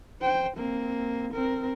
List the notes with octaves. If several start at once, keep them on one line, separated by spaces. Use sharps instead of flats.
C5 G5
A#3 C4
C4 A#4